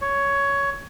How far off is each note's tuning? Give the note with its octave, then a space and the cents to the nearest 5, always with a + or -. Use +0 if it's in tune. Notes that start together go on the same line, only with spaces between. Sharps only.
C#5 +10